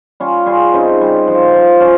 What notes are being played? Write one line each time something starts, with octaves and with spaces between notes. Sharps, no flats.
G3 C#4 F4
G3 F4 G#4
C#3 C4 D#4
G3
F3
F3
F3 C#4